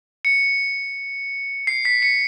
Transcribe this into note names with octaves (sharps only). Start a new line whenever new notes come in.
C#7
C7
B6
C#7